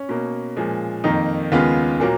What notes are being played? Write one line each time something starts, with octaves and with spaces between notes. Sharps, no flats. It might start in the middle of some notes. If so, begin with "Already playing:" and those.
Already playing: C#4
B2 A#3
A#2 F3 G#3
F2 D#3 A#3 D#4
D#2 C#3 G#3 B3 F4
A#2 F#3 A#3